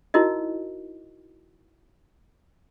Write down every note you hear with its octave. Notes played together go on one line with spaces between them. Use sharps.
D#4 E4 F#4 A#4 D#5